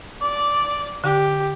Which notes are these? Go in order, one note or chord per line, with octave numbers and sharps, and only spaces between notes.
D5 D6
D3 G4